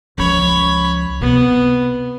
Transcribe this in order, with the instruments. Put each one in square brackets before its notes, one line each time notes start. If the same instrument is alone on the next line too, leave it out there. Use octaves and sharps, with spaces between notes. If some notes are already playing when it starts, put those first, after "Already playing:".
[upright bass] C#2 F3 [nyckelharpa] C#5 B5
[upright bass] C3 [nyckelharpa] B3